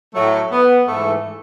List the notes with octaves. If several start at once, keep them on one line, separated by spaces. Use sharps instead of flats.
A2 F#3 A3
B3
G#2 E3 A3